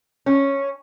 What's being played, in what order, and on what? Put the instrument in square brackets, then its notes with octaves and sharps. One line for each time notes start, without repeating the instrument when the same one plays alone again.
[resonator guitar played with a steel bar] C#4